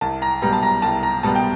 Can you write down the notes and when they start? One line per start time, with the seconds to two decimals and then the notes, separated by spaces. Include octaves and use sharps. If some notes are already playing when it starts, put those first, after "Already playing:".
0.01 C2 A5
0.22 A#5
0.42 B2 G3 B3 A#5
0.53 A5
0.63 A#5
0.82 C2 A5
1.03 A#5
1.23 B2 G3 B3 A5
1.35 G5